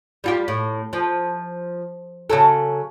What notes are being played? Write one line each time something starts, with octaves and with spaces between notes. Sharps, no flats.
G3 F4 G4
A2
F3
C#3 F#3 A4